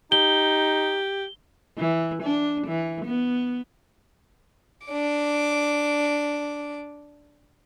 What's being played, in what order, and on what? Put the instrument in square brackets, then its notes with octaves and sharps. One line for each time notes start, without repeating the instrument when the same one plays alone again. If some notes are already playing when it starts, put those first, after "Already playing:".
[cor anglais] D#4 [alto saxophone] G4 [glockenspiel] G7
[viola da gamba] E3
D4
E3
B3
[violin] D4 D6